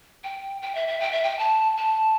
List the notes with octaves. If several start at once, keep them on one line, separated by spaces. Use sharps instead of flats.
G5
G5
E5
E5
G5
E5
G5
A5
A5